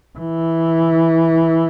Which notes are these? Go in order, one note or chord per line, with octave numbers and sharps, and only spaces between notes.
E3